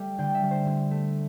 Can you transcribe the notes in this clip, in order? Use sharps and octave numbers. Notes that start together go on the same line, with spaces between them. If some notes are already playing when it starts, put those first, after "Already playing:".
Already playing: G3 A3
D3 G5
E5
G3
C5
D3
A3